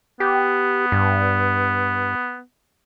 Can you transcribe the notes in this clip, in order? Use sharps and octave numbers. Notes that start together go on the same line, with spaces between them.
B3 G4
G2